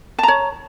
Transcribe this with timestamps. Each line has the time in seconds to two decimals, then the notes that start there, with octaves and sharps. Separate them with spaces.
0.19 A5
0.23 A#5
0.28 C#5